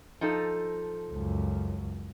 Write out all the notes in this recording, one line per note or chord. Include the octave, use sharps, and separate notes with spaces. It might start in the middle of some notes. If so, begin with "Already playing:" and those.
F3 D#4 A4
C#2 F#2